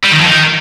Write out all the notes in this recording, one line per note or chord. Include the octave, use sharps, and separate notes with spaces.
G3
D#3
F2
D#3